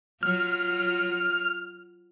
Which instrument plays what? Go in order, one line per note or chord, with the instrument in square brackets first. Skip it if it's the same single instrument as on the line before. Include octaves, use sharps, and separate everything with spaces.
[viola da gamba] F#3 F4 [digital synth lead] F6